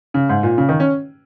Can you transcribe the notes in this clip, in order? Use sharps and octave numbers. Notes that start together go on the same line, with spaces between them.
C#3
G#2
A#2
C#3
D#3
C#4